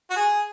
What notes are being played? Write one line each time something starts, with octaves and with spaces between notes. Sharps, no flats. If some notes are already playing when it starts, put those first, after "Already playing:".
F#4
G#4